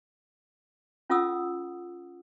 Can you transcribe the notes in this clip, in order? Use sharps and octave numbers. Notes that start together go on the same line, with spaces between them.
C#4 F4 A4 F#5 D#6 E6